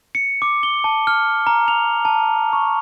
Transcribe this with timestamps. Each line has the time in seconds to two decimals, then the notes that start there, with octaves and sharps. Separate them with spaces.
0.15 C#7
0.42 D6
0.63 G7
0.84 A5
1.07 F6
1.47 A#5
1.68 F7
2.05 A5
2.53 C#6